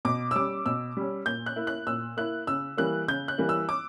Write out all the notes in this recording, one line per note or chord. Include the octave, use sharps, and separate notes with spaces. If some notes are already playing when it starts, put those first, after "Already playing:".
B2 D6
E6
G3 C#4 D6
B2 E6
G3 C#4
A#2 G6
F#6
A#3 E4
F#6
A#2 E6
A#3 E4 F#6
C#3 E6
E3 G3 A#3 F#6
C#3 G6
F#6
E3 G3 A#3
E6
D6